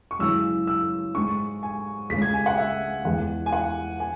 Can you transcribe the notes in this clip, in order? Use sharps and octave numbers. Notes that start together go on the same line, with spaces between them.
C#6
F#2 C#3 E3 G#3 E6
E6
G#2 G#3 C#6
G#5
C#2 C#3 G#3 B6
G#6
G#5
F#5
E5
E2 E3 G#3 F#5
G#5
F#5
G#5